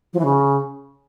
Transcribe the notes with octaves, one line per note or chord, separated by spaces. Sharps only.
F3
E3
C#3